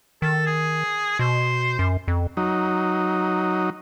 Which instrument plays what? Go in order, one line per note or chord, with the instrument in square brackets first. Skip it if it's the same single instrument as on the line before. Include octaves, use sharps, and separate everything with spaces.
[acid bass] D#3 [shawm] A4
[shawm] G#4
[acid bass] B2 [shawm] C5
[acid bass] F#2
F2
[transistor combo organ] F#3 D#4